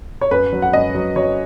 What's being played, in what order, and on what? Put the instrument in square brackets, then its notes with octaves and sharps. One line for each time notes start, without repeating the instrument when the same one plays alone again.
[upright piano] C#5
F#2 B4
F#3
F#5
F#2 D#5
F#3
F#3 C#5